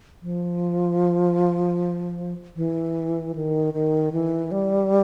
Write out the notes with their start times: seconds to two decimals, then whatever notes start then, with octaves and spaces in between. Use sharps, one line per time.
0.22 F3
2.56 E3
3.35 D#3
3.74 D#3
4.12 E3
4.51 G3